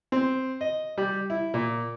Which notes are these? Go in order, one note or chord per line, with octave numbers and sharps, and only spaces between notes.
C4
D#5
G3
E4
A#2